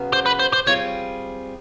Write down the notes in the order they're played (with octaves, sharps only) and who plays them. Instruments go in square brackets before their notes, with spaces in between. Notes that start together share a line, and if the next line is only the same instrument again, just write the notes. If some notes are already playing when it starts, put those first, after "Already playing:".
Already playing: [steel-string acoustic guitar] C#3 F#3 B3
[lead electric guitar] C5
B4
C5
C5
[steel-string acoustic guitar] G3 C4 F4 G#4 [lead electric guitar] C#5